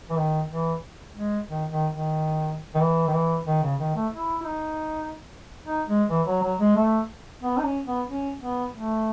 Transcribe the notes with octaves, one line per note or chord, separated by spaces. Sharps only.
E3
D#3
E3
G#3
D#3
D#3
D#3
D#3
E3
D#3
E3
D#3
C#3
D#3
A3
E4
E4
D#4
D#4
G#3
E3
F#3
F#3
G#3
A3
B3
D#4
C#4
B3
C#4
B3
A3